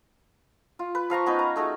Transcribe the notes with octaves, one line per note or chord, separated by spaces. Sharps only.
F4
B4
F3 F5 A#5 C#6
B3 C#4 D#4 B4
A#5
A3 D#4 F#4 G#4